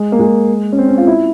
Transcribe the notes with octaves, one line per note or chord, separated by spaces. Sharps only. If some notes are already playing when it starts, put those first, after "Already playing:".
Already playing: G#3
A#3
G#3
C#4
C4
C#4
F4
E4